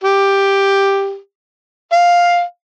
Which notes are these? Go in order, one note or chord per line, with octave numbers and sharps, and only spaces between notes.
G4
F5